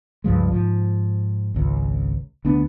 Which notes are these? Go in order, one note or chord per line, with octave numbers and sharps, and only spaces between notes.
C#2 G2 F3 G#3
G#2 F3
G#1 C#2
D2 B3 D4